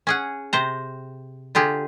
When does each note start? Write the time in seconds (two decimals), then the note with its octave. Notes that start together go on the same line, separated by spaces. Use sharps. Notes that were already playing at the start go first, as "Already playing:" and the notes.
0.07 C#4 G#4 F#5
0.53 C3 C5 A#5
1.55 D3 F4 G4 G#4